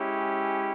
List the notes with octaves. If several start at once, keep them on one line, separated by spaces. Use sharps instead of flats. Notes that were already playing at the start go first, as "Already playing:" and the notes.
Already playing: G#3 C#4 E4 G4